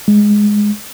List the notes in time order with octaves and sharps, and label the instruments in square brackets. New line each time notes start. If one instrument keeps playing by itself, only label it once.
[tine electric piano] G#3